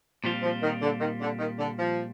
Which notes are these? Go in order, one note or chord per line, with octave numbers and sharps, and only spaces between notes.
A#2 F3 G3 C4 F4
F3
D#3
D3
D#3
D3
D#3
D3
F3